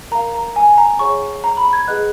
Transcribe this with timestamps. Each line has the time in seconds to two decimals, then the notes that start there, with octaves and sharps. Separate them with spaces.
0.11 A#4 F5 A#5
0.34 A#5
0.56 G#5
0.78 A#5
0.99 G#4 C#5 F#5 C#6
1.44 A#5
1.57 B5
1.73 G#6
1.87 G#4 B4 D#5 F#5 F#6